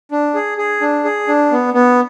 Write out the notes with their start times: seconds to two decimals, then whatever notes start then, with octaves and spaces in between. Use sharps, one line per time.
0.11 D4
0.35 G#4
0.58 G#4
0.81 D4
1.04 G#4
1.28 D4
1.51 B3
1.74 B3